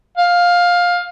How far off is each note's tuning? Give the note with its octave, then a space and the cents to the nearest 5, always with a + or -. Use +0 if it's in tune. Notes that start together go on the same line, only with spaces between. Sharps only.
F5 +15